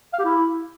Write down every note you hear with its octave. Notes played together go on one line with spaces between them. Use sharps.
F5
G4
E4